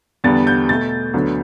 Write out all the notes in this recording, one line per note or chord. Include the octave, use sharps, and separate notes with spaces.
E2 D3 G3 B3 A6
G6
B2 A3 A6
D2 D3 F#3 B3